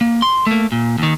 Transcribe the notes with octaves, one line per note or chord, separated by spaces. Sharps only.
A#3
C6
A3 A#3
A#2
D#2 D#3